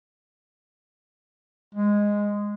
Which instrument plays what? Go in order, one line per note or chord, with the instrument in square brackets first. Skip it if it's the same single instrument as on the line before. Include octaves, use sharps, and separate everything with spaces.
[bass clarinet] G#3